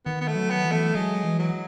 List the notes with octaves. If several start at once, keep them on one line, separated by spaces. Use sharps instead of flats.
D#3 B3
B3
A3
F#3
B3
E3
A3
F#3 G#3
E3
F#3